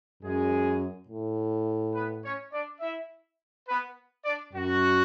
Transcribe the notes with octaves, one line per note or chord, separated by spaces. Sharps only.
F#2 G#3 G#4
A2
B3 B4
C#4 C#5
D4 D5
E4 E5
B3 B4
D4 D5
F#2 F#4